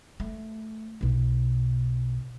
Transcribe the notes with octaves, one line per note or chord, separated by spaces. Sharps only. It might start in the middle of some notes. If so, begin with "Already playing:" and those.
A3
B1 B2